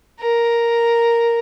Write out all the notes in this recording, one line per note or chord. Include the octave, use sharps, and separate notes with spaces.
A#4